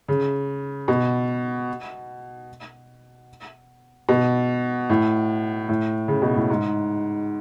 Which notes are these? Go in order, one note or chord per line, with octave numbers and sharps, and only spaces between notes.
C#3
B2
B2
A2
A2
C#3
B2
A2
G#2